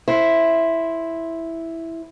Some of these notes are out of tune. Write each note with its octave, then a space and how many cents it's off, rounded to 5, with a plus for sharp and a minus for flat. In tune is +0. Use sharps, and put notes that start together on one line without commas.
E4 +0 C5 +0